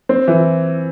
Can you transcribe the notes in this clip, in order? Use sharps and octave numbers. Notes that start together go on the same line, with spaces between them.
C4
E3